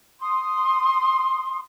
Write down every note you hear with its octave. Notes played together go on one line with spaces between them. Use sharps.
C6 D#6